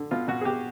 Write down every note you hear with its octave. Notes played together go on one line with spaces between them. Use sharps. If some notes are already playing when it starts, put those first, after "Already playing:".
Already playing: D3
B2 F4
B2 F#4
G#4
B2 G4